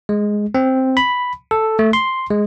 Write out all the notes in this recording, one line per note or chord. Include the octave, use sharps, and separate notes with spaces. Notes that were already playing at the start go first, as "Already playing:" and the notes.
G#3
C4
B5
A4
A3
C6
G#3